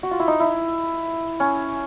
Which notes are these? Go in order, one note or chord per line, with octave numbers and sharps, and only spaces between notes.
F#4
F4
E4
D#4
E4
C#4